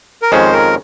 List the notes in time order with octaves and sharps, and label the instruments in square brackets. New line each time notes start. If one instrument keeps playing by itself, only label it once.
[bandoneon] A#4
[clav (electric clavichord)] F2 D#3 G#3 C#4 [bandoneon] C5
[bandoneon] A#4